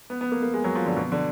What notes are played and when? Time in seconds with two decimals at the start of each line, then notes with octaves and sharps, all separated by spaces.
0.10 B3
0.21 B3
0.32 A#3
0.43 A#3
0.54 G#3
0.64 F#3
0.75 F3
0.86 D3
0.97 B2
1.12 D3